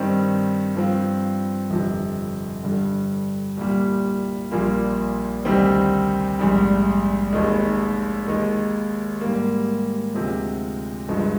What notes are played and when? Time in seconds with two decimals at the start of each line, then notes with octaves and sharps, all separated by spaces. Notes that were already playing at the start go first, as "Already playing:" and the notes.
Already playing: G2 D#3 G3 C4
0.75 G2 F3 C4 F4
1.70 G1 F2 C3 F3
2.63 G2 D3 G3
3.57 C2 A#2 G3
4.51 A#1 A#2 G3 A#3 F4
5.45 D2 C3 D#3 G3 C4
6.39 A#1 G#2 G3
7.33 F1 D#2 D#3 G#3
8.27 D#2 D#3 G#3
9.21 G#2 G3 A#3
10.15 D2 C3 F3 G#3
11.08 G1 G2 F3 G#3